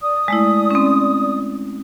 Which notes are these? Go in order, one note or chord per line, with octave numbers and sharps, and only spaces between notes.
D5 D#6
G#3 A3 E4
C4 C#4